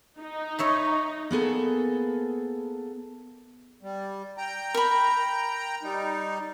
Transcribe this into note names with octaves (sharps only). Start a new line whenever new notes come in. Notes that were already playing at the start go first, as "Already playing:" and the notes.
D#4
C#5 E5 B5
A#3 B3 G#4 A4
G3
G5 A#5
A#4 B5
G3 D#4